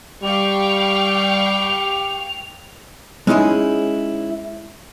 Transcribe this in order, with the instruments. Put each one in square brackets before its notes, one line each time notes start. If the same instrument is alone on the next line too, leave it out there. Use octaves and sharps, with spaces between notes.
[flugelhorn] G3 [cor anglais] G4 [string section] F5 G5 C#6 [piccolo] F7
[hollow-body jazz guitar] G#3 C#4 D#4 E4 G#4